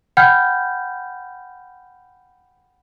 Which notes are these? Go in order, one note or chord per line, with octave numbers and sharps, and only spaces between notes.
F#5 G5 B5 F6 G6 G#6